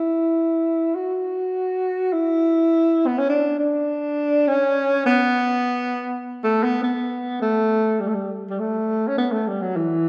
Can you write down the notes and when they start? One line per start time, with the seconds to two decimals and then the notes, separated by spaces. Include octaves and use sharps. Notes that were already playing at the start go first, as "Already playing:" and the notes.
Already playing: E4
0.95 F#4
2.13 E4
3.07 B3
3.18 C#4
3.29 D4
3.59 D4
4.48 C#4
5.06 B3
6.43 A3
6.63 B3
6.83 B3
7.42 A3
8.00 G3
8.08 A3
8.15 G3
8.50 G3
8.60 A3
9.08 C#4
9.18 B3
9.32 A3
9.48 G3
9.62 F#3
9.76 E3